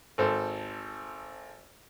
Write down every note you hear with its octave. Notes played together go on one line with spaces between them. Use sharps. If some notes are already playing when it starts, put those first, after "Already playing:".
G#1 A4 C5